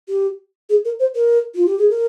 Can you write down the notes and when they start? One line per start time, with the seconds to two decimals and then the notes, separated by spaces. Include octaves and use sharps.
0.08 G4
0.69 G#4
0.85 A#4
0.99 C5
1.15 A#4
1.55 F4
1.66 G4
1.78 G#4
1.90 A#4